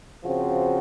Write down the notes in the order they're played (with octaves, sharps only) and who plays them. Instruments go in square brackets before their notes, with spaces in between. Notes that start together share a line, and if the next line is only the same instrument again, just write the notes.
[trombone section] C#3 F3 C4 F#4